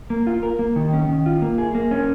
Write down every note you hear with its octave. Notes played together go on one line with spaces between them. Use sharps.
A#3
F4
A#4
A#3
D#3
C#4
D#3
F4
A#3
G#4
A#3
C#4